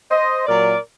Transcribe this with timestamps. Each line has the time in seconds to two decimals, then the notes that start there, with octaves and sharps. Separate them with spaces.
0.10 C5 D#5
0.46 A#2 F#3 A#4 D5